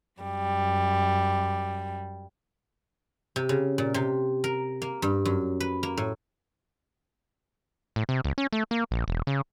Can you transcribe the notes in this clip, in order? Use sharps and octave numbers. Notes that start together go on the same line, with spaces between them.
F#2 G3
C3
C#3
A#2
C3
A#4
A#3
G2
F#2
B4
A#3
A2
A2
C3
C#2
C#4
A3
A#3
A#1
E1
C#3